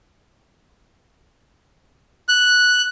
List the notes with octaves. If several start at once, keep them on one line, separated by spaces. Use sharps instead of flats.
F#6